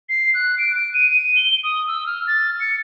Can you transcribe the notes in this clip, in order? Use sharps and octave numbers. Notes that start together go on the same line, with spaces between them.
C7
F#6
D7
D7
D#7
D#7
G7
D#6
E6
F6
A6
C#7